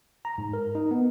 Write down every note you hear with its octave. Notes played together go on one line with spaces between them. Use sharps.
A#5
G#2
A#4
D#4
B3